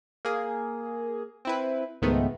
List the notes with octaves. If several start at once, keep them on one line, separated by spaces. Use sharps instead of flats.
A#3 G#4
C4 E4 B4
C#2 G#2 D#3 G#3 A3 B3